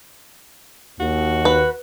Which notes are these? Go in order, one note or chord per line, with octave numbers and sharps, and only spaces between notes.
D#2 F#4
B4